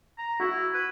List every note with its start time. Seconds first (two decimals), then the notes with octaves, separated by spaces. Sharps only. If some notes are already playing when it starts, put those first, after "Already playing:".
0.18 A#5
0.40 E4 F#4
0.74 B4